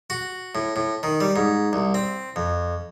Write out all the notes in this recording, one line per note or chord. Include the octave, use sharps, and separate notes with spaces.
F#4
A2
A2
D#3
G3
G#2
C2
C4
F2